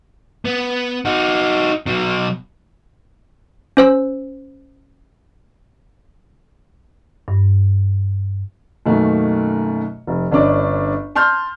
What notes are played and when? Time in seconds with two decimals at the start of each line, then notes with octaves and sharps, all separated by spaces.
0.45 B3
1.05 D#4 F#4
1.86 B2 F#3
3.77 C#4 C5 E6
7.28 G2
8.86 F#2 B2 D#3 A3 A#3
10.07 F1
10.31 G1 C#4 D4 D5 D#5
11.16 A5 C6 F6 G6